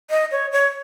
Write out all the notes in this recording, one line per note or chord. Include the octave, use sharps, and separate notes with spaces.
D#5
C#5
C#5